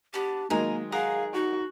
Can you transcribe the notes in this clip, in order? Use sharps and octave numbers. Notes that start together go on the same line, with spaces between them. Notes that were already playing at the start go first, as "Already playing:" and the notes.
B3 D4 G4
D#3 F#3 G#3 A#3 A#4 G#5
G#4 A#4 F5 F#5 D#6
D#4 F#4